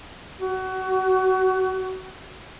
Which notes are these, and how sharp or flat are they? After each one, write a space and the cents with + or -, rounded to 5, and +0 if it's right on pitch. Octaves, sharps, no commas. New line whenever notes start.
F#4 +25